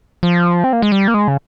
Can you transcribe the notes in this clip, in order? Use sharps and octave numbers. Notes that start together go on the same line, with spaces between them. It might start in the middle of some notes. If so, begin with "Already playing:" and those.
F3
C4
A#3
G#3
G3
A#3
G#3
C#3